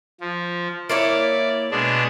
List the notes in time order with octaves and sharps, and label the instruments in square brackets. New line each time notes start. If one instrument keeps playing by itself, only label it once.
[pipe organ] F3
[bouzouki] A#3 E4 C#5 [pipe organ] D5
[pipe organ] B2 G#3 D4